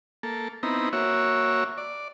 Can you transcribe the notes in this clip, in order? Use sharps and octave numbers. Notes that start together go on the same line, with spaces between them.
A#3 A4
B3 C4 D#4 E4 A#5
A#3 F#4 C#5 E5
D5